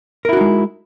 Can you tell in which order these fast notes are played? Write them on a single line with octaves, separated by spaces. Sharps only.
A#4 E4 F#4 D#4 G#3